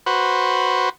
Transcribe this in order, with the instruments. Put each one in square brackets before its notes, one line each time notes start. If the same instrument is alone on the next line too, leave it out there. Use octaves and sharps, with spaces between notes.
[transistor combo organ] F#4 B4 C5